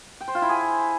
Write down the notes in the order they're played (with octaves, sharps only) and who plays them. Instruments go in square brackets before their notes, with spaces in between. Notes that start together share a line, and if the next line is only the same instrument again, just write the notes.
[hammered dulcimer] G5
C5
F4
E4
G#4